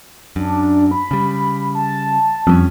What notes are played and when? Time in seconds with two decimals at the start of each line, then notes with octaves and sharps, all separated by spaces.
0.36 F#2 D4
0.91 B5
1.11 C#3 G3
1.75 A5
2.47 F2 G3 A#3 C#4